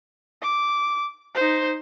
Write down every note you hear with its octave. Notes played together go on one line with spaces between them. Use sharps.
D6
D#4 C5